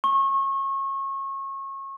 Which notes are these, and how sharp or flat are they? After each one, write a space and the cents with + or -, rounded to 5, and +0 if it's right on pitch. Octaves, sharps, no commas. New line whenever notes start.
C#6 -30